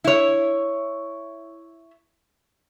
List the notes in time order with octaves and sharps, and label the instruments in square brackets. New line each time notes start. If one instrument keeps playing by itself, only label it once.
[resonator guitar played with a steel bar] E4 C#5